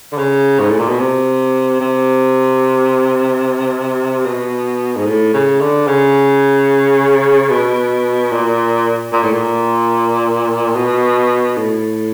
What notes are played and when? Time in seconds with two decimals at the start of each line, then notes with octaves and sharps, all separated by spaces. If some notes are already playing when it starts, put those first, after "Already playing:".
0.12 D3
0.18 C#3
0.59 G#2
0.70 A2
0.79 A#2
0.89 B2
0.99 C3
1.80 C3
4.25 B2
4.97 G#2
5.06 A2
5.34 C#3
5.61 D3
5.87 C#3
7.50 B2
8.32 A#2
9.12 A#2
9.24 A2
9.34 A#2
10.75 B2
11.57 A2